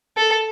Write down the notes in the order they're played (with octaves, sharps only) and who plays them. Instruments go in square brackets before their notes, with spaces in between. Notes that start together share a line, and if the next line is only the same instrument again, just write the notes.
[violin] A4